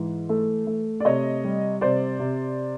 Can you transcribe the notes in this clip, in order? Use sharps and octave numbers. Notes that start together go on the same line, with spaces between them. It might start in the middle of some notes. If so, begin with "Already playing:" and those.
Already playing: G#2 E3
A3
A3
D5
C3 C#5 D#5
G3
C3 C5 D5
C3